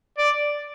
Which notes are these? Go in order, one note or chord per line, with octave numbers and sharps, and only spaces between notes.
D5